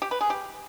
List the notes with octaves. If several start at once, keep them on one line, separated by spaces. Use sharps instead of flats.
G4
B4
G#4
G4